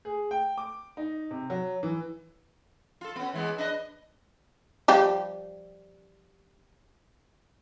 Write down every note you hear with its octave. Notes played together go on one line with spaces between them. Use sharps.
G#4
G5
D6
D#4
C3
F#3
E3
F4 A4
B3 C#4
E3 G#3 B3
D4 B4 D#5
F3 G3 G4